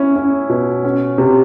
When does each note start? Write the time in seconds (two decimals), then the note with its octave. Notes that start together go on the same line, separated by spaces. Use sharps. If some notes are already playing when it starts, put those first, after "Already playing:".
Already playing: C#4 E4
0.16 C#4
0.50 B2
0.84 C#4
1.18 C3